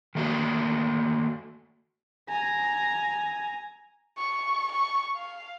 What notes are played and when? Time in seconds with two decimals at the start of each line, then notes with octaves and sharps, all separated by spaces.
0.15 D#3 A3 A#3 F#4
2.29 G#5 A#5
4.18 C#6
4.72 C#6
5.16 F5